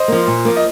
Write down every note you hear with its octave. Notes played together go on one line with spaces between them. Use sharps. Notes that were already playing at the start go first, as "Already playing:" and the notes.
Already playing: C5 D#5
F3 A#3
A#2
F3 A#3
D#5